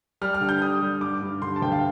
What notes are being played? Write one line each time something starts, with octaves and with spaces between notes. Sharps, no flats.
G3 F6
F6
D3
G6
G3 D#6
G3
G2 D6
G2
D3 C6
A5
D2 G5
F5